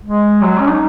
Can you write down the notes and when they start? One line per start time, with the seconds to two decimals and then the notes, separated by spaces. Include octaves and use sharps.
0.05 G#3
0.42 F#3
0.60 C#4
0.69 D#4